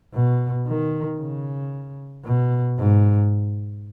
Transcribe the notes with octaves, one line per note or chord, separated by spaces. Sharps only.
B2
D#3
C#3
B2
G#2